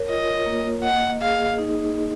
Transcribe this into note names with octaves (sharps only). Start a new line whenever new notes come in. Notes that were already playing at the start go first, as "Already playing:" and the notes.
Already playing: A#4 C#5
F4 D#5
A#3
D#5 F#5
G#4 F5
D#4